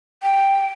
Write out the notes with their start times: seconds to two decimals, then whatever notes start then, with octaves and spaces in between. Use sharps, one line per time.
0.23 G5